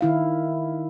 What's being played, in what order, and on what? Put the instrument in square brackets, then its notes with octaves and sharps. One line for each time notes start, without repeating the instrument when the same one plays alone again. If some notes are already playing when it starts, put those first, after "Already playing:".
[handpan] D#3 E4 F5